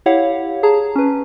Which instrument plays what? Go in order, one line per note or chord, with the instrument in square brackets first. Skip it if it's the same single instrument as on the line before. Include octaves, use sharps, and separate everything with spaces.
[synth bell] E4 G4 C#5 F5 F#5
G#4 A5 A#5
C#4 B4